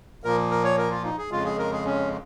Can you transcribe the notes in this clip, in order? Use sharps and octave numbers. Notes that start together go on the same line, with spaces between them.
A#2 F3 A#3 A#4
A#4
C#5
A#4
F4
D#4
G#4
F2 C#3 G#3 F4
G#4
A#4
G#4
C#4